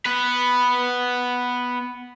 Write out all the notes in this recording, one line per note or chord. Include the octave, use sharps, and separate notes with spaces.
B3 B4